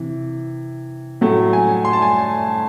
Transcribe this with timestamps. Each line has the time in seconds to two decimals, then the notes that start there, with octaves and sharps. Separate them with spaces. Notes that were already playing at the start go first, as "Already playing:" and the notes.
Already playing: C3 E3
1.21 A2 F#3 A3
1.53 G#5
1.85 C6
1.93 A5
2.02 G#5